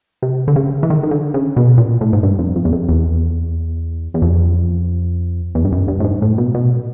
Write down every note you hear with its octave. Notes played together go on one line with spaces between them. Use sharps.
C3
D3
C#3
E3
D#3
D#3
D3
C#3
B2
A#2
A2
G#2
G2
F2
F2
E2
F2
E2
E2
F2
E2
G2
F#2
G2
A2
G#2
A2
B2
B2